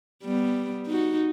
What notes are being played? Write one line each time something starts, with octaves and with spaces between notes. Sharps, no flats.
G3 B3
D#4 F#4